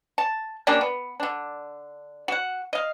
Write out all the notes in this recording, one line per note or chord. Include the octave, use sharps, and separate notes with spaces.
A5
G3 A#3 C#4 D4
B3
D3 D4
F#4 F#5
D#5 F5